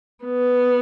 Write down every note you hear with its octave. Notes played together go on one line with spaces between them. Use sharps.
B3